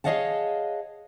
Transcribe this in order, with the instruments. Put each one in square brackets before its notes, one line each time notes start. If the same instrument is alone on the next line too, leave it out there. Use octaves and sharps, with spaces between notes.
[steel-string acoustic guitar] G#4 C#5 D#5 F5 F#5 A5